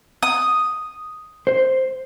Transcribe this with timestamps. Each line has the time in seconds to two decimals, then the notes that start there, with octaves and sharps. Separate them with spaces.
0.23 D#6
1.47 C5